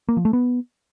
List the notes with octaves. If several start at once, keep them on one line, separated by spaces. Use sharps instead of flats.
A#3
F3
A3
B3